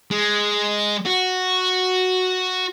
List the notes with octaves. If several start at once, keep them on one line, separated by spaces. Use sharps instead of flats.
G#3
F#4